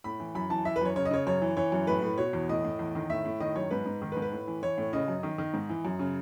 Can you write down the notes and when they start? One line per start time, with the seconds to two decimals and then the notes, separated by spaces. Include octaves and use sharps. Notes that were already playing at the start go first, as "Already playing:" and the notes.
0.04 A2 B5
0.20 E3
0.35 F#2 B5
0.50 E3 A5
0.65 E3 E5
0.76 B4
0.81 F#2 C#5
0.96 C#3 C#5
1.05 D#5
1.11 C#3 C#5
1.27 F#2 C#5
1.42 E3
1.57 E3 C#5
1.72 F#2
1.87 A2 B4
2.02 A2
2.18 B2 C#5
2.33 E2
2.49 A2 D#5
2.65 A2
2.79 E2
2.95 D#3
3.10 A2 E5
3.25 A2
3.40 D#3 D#5
3.55 F#2 C#5
3.71 G#2 B4
3.86 G#2
4.02 D#3
4.12 B4
4.17 G#2
4.22 B4
4.32 A2
4.47 E3
4.63 E3 C#5
4.78 A2
4.93 C#3 D#5
5.08 F#2
5.23 D#3
5.38 D#3
5.54 G#2
5.69 E3
5.85 F#2
5.99 C#3